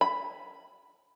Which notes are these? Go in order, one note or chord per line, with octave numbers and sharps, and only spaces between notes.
B5